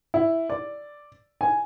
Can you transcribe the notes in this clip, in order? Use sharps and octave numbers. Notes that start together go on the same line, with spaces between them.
E4
D5
G#5